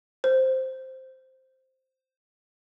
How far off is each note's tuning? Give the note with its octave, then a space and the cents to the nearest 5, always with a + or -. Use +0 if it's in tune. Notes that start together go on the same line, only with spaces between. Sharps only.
C5 +0